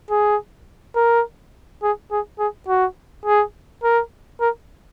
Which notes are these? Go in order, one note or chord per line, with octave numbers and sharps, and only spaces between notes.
G#4
A#4
G#4
G#4
G#4
F#4
G#4
A#4
A#4